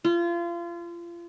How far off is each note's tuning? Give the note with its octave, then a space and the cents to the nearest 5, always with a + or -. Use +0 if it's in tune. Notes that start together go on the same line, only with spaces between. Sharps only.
F4 -30